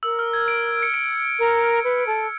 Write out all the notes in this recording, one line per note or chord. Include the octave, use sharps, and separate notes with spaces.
A#4 E6
F6
G#6
D7
C#7
D7
A#4
B4
A4